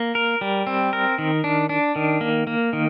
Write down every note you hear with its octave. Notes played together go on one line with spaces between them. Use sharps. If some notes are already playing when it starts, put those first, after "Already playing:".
Already playing: A#3
A#4
G3
C4
A#4
D#3
D4
D4
D#3
A#3
A#3
D#3